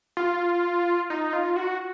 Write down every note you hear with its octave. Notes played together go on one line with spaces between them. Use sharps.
F4
D#4
F4
F#4